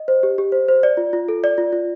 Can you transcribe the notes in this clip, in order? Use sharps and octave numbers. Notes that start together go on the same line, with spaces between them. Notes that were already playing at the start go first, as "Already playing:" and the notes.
Already playing: D#5
C5
G4
G4
C5
C5
D5
F4
F4
A4
D5
F4
F4